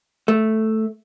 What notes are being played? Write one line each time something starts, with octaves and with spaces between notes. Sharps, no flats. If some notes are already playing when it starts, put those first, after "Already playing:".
A3